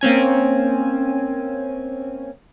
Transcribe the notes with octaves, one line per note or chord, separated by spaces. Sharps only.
A#3 C4 C#4 G#5